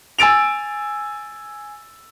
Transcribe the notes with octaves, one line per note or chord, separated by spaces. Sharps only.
G#5 E6 A6 D7 F7